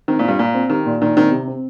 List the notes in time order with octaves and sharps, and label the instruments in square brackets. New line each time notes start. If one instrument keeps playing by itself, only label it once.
[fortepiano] D#3 [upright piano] C4
[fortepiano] A#2
[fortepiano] G2 [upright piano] F4
[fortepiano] A#2 [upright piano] F4
[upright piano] C4
[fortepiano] D#3 [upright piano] G4
[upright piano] A#2
[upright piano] A#2 [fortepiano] D#3
[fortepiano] D#3 [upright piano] C4
[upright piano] C3
C4